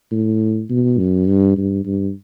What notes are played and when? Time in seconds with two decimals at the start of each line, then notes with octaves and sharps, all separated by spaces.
0.11 A2
0.70 B2
0.98 F#2
1.28 G2
1.57 G2
1.85 G2